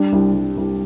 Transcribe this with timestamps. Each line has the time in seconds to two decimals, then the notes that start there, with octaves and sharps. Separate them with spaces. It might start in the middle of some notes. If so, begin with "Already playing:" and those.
Already playing: G3 D4
0.12 C2
0.34 G3
0.57 C2